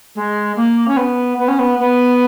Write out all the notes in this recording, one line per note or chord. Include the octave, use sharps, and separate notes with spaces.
G#3
A#3
C#4
B3
B3
C#4
B3
B3